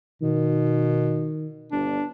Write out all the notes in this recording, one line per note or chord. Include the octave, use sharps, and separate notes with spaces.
B2 D#3
G1 D4